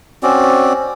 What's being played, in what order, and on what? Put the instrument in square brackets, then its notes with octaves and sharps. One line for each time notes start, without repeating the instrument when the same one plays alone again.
[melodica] C4 C#4 F#4 D5